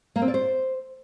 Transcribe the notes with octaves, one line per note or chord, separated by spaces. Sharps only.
A#3
C4
D5
C5